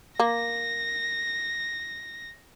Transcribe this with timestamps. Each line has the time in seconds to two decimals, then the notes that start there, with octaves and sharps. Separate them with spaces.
0.20 A#3 A#6